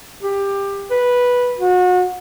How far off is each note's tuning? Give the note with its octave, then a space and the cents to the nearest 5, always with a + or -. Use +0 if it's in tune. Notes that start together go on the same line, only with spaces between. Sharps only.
G4 +20
B4 -10
F#4 -35